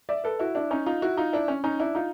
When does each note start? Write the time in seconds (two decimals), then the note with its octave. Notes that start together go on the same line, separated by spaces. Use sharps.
0.09 D5 E5
0.24 A4 B4
0.39 E4 F#4
0.55 D4 E4
0.71 C#4 D#4
0.86 D#4 F4
1.02 E4 F#4
1.17 D#4 F4
1.33 D4 E4
1.48 C#4
1.64 C#4 D#4
1.79 D4 E4
1.95 D#4 F4